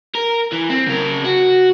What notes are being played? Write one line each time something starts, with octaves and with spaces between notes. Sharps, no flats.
A#4
E3
C4
C#3 A#4
F#4